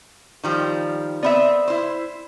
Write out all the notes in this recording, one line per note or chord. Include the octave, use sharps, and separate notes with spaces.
D#3 F3 G3
B3 C4 D5 E5 B5
E4 C5